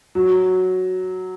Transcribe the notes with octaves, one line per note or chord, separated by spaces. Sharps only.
F#3